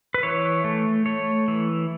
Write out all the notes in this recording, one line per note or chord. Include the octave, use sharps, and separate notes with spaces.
B4
E3 C#5
A3
A3 C#5
E3